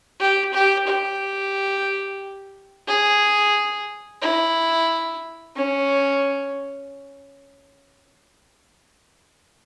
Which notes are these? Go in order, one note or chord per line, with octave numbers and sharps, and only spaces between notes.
G4
G4
G4
G#4
E4
C#4